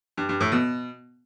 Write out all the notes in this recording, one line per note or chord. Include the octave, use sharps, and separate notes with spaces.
G2
G2
A2
B2